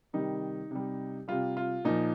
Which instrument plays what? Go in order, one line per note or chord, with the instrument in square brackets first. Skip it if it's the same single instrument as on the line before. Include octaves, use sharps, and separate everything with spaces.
[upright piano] C3 D#3 G3 D#4
C3 G3
C3 G3 F4
F4
A#2 F3 D#4